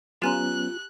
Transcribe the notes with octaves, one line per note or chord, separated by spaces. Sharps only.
F#3 B3 C#4 F4 G4 G#5 A#5 F#6